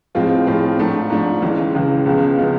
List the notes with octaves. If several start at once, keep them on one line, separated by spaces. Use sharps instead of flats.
A2 F3 G#3 C4 F4
A2 F3 G#3 C4 F4
G#2 F3 A3 D4
G#2 F3 A3 D4
C#2 C#3 E3 G#3
C#2 C#3 E3 G#3
C#2 C#3 F3 G#3 B3
C#3 F3 G#3 B3